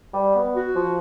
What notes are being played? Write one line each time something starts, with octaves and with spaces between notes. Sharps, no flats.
G3
B3
F#4
F3